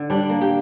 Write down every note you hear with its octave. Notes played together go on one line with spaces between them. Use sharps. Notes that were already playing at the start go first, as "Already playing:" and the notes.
Already playing: D3
G3 D4
A#3
G4